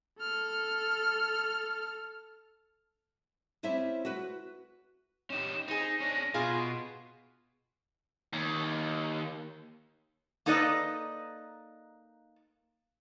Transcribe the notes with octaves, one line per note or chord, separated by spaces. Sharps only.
A4 F6
G3 C4 C#4 E4 E5
F#4 B4
C#4 D#4 G4 E7
C4 D#4 G#4 A#6
C#4 D4
B2 F4 G#4 D#5 C6
D#2
A#3 D#4 A4 B4 D5 D#5